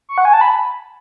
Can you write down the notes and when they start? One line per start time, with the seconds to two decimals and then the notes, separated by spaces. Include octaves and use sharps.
0.09 C#6
0.18 F#5
0.25 G#5
0.33 A5
0.41 B5